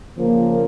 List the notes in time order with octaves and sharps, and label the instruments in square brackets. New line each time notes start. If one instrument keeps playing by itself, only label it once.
[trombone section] C#3 F3 A#3